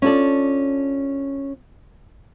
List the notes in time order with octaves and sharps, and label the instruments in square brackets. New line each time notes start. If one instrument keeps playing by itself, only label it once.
[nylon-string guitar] C#4 D4 F4 A4 D5